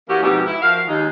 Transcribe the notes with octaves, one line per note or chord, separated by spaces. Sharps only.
E3 A#3 C#4 E4 F#4 G4
F2 G#2 B2 D#4 G4
E4
F3 F#4 A#4 F5
D#2 G#3 D#4